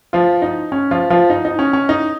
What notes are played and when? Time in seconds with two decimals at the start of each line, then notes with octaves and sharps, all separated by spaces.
0.13 F3 F4
0.42 D#4
0.72 C#4
0.91 F3 F4
1.10 F3 F4
1.30 D#4
1.45 D#4
1.59 C#4
1.73 C#4
1.89 D#4